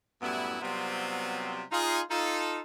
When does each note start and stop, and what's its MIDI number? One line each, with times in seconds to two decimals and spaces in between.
0.21 0.56 42
0.21 0.56 45
0.21 0.56 55
0.21 0.56 59
0.21 0.56 64
0.61 1.62 48
0.61 1.62 54
0.61 1.62 55
0.61 1.62 59
0.61 1.62 60
0.61 1.62 65
1.71 2.00 63
1.71 2.00 65
1.71 2.00 68
2.10 2.59 63
2.10 2.59 65
2.10 2.59 69